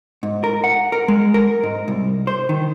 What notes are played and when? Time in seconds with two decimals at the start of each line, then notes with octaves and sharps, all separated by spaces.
0.23 G#2
0.44 A#4
0.64 F#5
0.92 A#4
1.08 G#3
1.34 A#4
1.63 G#2
1.88 C2
2.27 C5
2.49 D#3